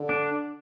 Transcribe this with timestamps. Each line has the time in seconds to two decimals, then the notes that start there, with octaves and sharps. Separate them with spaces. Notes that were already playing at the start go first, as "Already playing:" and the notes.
Already playing: D3
0.09 D4